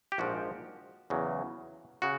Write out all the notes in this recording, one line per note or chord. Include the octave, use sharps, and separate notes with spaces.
G4
A#1 G#2 F3 G#3 F#4
E2 C#3 F#3
C#3 F#4